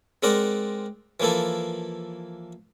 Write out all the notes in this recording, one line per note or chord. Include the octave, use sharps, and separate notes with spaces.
G#3 C4 A#4 D5 F#5
E3 F3 A#3 E4 A4